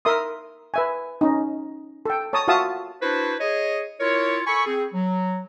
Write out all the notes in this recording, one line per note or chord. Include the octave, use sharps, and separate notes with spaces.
A#4 E5 C6 D#6
B4 E5 G#5
C#4 D#4
A4 G5
C#5 A5 A#5 D#6
F4 F#4 E5 F5 A5 D#6
D4 E4 F#4 B4 C5
G#4 C#5 D#5
E4 F4 A#4 C#5
A4 G#5 B5 C#6
C4 G#4
F#3